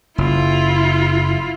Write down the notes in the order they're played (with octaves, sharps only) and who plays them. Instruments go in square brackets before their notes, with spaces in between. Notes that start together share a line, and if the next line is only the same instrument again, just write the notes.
[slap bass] F#1 [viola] E4 F4